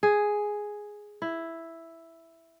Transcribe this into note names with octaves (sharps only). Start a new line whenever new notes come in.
G#4
E4